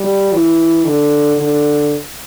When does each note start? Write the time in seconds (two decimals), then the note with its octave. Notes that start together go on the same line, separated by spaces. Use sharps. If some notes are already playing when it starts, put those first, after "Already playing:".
Already playing: G3
0.33 E3
0.84 D3
1.37 D3